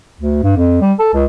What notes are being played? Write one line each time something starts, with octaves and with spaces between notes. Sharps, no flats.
D2
G2
F2
G3
A4
C#2